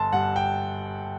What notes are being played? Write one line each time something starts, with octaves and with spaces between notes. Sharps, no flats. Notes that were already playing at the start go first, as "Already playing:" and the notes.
Already playing: G1 A5 C6
G2 F#5
G5